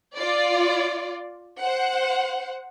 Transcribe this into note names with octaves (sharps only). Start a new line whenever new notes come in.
F4 D5
C5 F#5